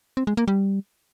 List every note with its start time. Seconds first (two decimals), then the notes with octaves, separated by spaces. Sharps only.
0.17 C4
0.27 G#3
0.37 A#3
0.48 G3